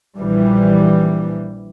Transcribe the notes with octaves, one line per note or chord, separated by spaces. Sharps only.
A#1 E3 G3